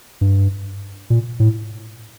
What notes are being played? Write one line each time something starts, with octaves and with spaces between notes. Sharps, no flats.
G2
A#2
A2